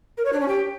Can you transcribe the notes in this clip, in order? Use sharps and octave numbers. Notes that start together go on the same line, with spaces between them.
A#4
C#5
D4
C#4
G4